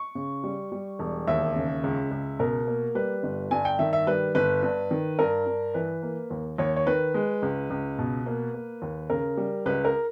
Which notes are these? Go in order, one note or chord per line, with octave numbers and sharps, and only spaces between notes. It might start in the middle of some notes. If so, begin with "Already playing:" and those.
Already playing: C#6
C#3
G3
G3
E1
D#2 E5
C#3
C#2
C#2
B2 A#4
A#3
G3 B4
G1
G2 G#5
G5
D#3 E5
E5
G3 B4
G1 B4
G2
D#3
G2 A#4
G2
E3 B4
A#3
D#2
D#2 C#5
C#5
D#3 B4
G#3
C#2
C#2
B2
A#3
A#3
D#2
C#3 A#4
G3
C#2 B4
A#4